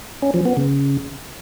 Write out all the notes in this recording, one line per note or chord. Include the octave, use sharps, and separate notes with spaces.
C#4
F3
B3
C#3